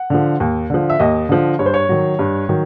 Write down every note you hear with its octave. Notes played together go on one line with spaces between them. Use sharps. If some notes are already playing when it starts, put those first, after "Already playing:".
Already playing: F#5
D3 F3
D#2
D3 F3
E5
D#2 D#5
D3 F3
G2 C#5
C5
C#5
D#3 F#3
G2
D#3 F#3